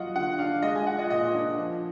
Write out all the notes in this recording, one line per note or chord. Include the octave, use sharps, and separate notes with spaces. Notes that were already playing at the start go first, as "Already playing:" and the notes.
Already playing: F#3 F4 D#5 F#5
D3 F#5
D4 F5
G#3 D#5
G#5
F4 F#5
D#5
A#2 D#5
D4
F3